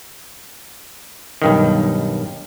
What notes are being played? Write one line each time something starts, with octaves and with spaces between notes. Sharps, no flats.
B1 G2 D#3